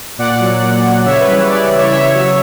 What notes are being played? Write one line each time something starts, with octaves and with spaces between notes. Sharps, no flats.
A#2 D5 F#5
F#3
A#2
F#3
C#3 C#5 E5
B4
E3 G3
C#3 B4 D5
E3 G3
C#5 E5
C#3 C#5 E5
F#3 C#5 E5